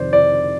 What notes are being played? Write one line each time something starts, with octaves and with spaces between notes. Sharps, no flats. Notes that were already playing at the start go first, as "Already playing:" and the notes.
Already playing: F2 C3 D#3 C5 D5
D5